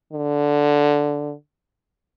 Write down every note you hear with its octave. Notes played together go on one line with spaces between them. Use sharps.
D3